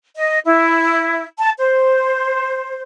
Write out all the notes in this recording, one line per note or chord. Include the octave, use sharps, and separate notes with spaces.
D#5
E4
A5
C5